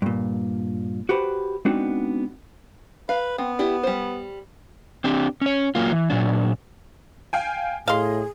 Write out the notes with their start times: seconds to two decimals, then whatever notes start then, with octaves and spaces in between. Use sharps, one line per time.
0.02 G2 A#2
1.09 F#4 G4 B4 C5
1.65 G#3 B3 C4 D4 D#4 F#4
3.09 B4 F5
3.38 B3 C4
3.59 E4 G4 D5
3.83 G3 C5
5.04 C4 D4 G4
5.42 C#4 C#5
5.75 F#3 A#3 F4
5.91 E3
6.10 A#2 F#3 D4
7.33 F5 G5 G#5
7.88 A2 G#4 D#5 F5 C6